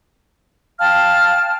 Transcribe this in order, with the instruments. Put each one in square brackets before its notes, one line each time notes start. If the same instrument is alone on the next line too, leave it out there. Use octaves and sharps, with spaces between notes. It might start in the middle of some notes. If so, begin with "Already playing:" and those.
[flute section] F5 G5 A5 F6